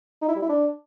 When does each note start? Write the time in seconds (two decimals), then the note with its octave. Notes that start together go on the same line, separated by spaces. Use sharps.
0.22 D#4
0.29 E4
0.36 G3
0.42 E4
0.49 D4